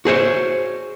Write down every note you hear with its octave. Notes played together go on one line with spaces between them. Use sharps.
F#4 G#4 C5 C#5